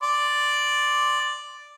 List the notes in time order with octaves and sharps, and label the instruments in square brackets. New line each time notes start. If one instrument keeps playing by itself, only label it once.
[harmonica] D5 C6